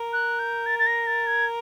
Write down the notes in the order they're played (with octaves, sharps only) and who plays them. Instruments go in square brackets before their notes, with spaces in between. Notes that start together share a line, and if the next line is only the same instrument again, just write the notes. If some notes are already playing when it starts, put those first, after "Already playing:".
Already playing: [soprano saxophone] A#4
[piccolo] F#6
G6
A6
A6
A#6
A6
G#6